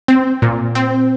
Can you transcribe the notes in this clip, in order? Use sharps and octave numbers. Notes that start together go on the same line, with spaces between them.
C4
A#2
C4